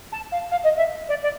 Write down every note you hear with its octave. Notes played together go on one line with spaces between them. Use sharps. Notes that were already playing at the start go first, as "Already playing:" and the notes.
A5
F5
F5
D#5
E5
D5
D5